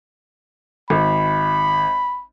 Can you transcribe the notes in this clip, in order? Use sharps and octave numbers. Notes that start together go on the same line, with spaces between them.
G#1 B5